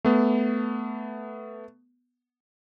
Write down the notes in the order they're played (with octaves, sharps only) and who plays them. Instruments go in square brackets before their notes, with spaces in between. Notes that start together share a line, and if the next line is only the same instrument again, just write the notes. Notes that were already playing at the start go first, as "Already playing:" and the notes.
[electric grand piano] A3 B3